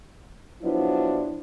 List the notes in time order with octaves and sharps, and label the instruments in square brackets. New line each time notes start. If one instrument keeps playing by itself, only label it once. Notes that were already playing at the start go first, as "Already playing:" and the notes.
[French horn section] F3 F#3 B3 D4 E4 F4